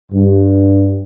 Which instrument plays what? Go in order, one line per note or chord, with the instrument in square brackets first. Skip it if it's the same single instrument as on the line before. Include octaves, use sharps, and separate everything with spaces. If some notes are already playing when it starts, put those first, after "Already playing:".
[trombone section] G2